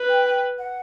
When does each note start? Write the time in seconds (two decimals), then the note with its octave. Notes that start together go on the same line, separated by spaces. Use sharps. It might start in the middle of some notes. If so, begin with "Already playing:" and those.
Already playing: B4
0.09 G5
0.25 G5
0.58 F#5